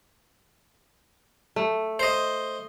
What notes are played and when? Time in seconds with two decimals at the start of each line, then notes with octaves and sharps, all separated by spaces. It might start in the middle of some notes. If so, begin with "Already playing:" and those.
1.56 A3
1.99 C5 D#5